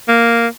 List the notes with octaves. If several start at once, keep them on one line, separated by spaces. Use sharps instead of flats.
A#3